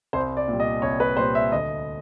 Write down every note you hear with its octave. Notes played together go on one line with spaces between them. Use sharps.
C2 C5
D5
A#2 G3
D#5
C2 C#5
B4
A#2 G3 C5
E5
D2 D#5